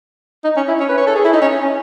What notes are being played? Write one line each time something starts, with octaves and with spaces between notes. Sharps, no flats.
D#4
C#4
E4
C#4
B4
C#5
A4
G#4
E4
D#4
C#4
C#4